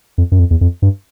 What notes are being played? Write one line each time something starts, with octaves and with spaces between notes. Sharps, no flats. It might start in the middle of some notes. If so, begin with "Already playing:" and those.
F2
F#2
F2
E2
F2
G2